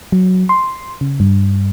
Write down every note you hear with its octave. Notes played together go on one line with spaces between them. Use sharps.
F#3
C6
C#3
G2